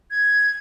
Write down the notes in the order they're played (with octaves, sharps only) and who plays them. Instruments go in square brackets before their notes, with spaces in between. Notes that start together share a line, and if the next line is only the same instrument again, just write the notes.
[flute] G#6